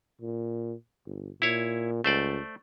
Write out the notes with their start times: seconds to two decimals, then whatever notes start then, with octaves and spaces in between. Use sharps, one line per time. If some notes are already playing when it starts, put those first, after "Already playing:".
0.21 A#2
1.06 G1
1.42 A#2 E4 C#5
2.04 C#2 A3 C5 D5